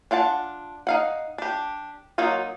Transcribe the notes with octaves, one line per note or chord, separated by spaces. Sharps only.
D4 F4 F#5 A5
D#4 F5 F#5
D4 G4
F#3 A#3 D#4 F4